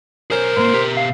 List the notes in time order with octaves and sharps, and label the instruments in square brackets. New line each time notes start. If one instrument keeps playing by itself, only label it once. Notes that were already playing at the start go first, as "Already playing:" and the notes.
[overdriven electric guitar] B1 C5 [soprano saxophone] C#4 [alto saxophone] A#4
[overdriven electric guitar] G#2 A#3 [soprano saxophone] C5
[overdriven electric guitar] B2 G4
[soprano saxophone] F5